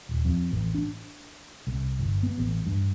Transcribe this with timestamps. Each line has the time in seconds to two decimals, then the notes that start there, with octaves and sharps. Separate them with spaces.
0.09 D#1
0.25 F2
0.51 A1
0.75 D4
1.67 C2
1.99 G1
2.23 B3
2.38 A1
2.66 G2